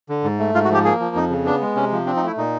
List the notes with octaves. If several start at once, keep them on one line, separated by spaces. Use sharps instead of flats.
D3
G#2
A3
G#2 F4
F#4
F3 G4
A#3 G#4
F3
F2 D#4
C#3
B3 D4
G#3
C3 C#4
F3
C4 D4
D#4
A3 E4
A#2 D#4